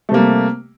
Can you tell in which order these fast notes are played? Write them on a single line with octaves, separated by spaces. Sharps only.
A3 C3 A#3 G3